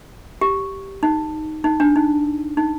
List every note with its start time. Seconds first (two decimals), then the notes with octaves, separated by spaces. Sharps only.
0.41 G4
1.03 D#4
1.64 D#4
1.80 D4
1.96 D#4
2.57 D#4